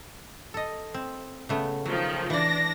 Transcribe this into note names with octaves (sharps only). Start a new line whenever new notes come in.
A4 D#5
C4
C#3 A3 B3
D#3 F3 F#3
E3 D4 D5 A#6